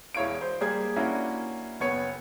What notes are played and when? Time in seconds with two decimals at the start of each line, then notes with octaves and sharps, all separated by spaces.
0.15 E1 E4 C#5 F5 D7
0.41 C5
0.61 G3 A#3 G#4 G#6
0.96 A#3 C#4 D4 E4 F#4
1.80 F#1 B3 C#5 C#7